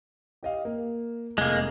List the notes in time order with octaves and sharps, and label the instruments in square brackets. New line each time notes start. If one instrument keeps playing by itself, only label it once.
[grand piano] G4 D#5 F5
A#3
[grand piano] F1 G7 [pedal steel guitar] G#3 A#3